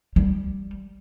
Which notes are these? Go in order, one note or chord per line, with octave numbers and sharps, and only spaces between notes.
G3